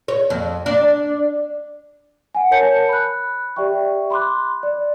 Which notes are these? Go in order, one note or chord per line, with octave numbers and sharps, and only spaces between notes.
C#5
F2
D4
F#5 G#5
A#4 C#5 A5 G6 C#7
B5 F#6
G4 D5 E5 G5 C#6
B5 C6 D6 F#6
D5